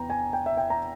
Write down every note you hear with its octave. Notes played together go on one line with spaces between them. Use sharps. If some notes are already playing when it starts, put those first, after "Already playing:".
Already playing: E2 B3 G5 A#5
G#5
G5
E5
G5
A#5